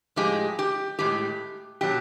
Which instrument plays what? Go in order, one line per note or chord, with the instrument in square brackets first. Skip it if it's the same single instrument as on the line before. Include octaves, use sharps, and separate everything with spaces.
[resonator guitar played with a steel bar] A2 F3 G#3 G4
G4
A2 F3 G#3 G4
B2 F#3 G4